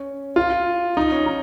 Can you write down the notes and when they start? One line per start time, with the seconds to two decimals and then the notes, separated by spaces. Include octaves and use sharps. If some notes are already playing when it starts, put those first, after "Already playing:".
Already playing: C#4
0.36 F4
0.97 D#4
1.12 C#4
1.26 D#4